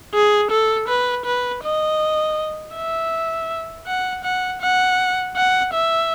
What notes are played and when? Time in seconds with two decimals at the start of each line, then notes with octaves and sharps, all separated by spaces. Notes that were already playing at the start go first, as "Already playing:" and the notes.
0.15 G#4
0.51 A4
0.88 B4
1.26 B4
1.63 D#5
2.76 E5
3.87 F#5
4.24 F#5
4.62 F#5
5.36 F#5
5.74 E5